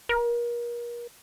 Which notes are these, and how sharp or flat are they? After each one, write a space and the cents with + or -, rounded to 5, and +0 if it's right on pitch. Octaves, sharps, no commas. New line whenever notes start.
A#4 +35